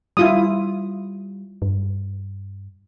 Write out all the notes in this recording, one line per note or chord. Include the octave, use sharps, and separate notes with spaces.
G3 E4 F4 D#6
G2